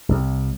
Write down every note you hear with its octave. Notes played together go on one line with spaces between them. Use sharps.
C2